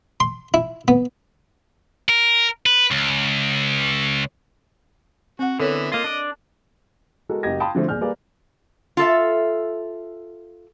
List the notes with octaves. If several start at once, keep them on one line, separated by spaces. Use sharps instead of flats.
C6
E4
B3
A#4
B4
C#2
C4 F#4 F#5
D3 E3 B3 E4 A4 A#4 C#5
A#3 F4 D#5
D4 D5
G#3 F#4 A4 A#4
F#1 F#2 G4 D#5 G#6 A#6
F5 G5 A5 B5 C6 D#6
D3 F3 A3 C4
D#1 G#4 D5 F6 G6
G3 A#3 G#4 B4 D5
F4 A4 E5